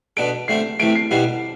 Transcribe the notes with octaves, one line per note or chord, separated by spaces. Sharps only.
B2 B3 D4 A4 D7
D3 A3 C4 C7
C3 E3 A3 D7
C7
B2 G3 B3 E4 C7